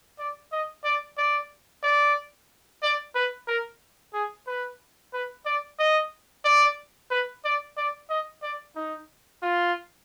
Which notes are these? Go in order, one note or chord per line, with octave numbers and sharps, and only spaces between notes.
D5
D#5
D5
D5
D5
D5
B4
A#4
G#4
B4
B4
D5
D#5
D5
B4
D5
D5
D#5
D5
D#4
F4